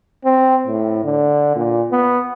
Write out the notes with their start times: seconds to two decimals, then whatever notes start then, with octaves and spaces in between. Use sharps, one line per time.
0.25 C4
0.67 A2
1.04 D3
1.56 A#2
1.92 B3